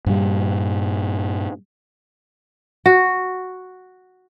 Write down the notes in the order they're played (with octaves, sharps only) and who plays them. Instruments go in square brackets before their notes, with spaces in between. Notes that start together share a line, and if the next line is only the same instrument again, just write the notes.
[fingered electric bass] G2 A#2 G3
[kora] F#4